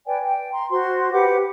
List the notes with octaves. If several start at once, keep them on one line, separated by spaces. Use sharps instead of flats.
B4 D5 G5 G#5
G5
A#5 C6
F#4 C5 C6
G4 B4 F#5 D6